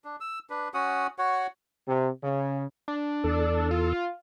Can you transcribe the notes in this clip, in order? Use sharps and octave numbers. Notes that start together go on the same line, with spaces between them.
D4
E6
D4 B4
C#4 F#4 F#5 D#6
F#4 C#5 F#5
C3
C#3
D4
E2 A4
F4